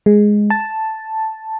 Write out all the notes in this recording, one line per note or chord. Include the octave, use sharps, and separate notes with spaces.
G#3
A5